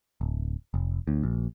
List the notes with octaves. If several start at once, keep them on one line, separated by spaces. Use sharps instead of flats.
D1
F1
D2
A#1